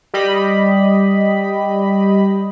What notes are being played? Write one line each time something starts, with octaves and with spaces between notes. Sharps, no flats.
G3 G4 D#5 B5